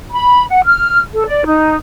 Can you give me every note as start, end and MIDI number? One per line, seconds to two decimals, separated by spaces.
0.11 0.45 83
0.50 0.61 78
0.65 1.01 89
1.14 1.24 69
1.27 1.44 74
1.46 1.75 63